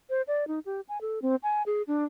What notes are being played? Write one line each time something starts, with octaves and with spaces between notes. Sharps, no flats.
C5
D5
D#4
G4
G#5
A4
C4
G#5
G#4
D4